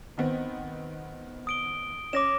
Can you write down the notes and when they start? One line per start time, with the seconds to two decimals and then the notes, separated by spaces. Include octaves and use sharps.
0.17 D#3 B3 C4
1.47 D#6 D7 G7
2.13 C#4 D6 A#6 E7